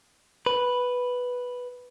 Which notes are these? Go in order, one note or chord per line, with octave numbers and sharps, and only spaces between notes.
B4